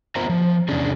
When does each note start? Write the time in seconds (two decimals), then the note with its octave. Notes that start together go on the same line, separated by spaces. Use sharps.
0.16 B3 F4 A#4 C5 E5 A#5
0.29 F3
0.69 E2 C3 C#4 D4 G#4